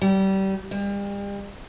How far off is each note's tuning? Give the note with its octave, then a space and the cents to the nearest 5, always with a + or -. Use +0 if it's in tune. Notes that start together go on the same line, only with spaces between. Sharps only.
G3 -25
G3 +40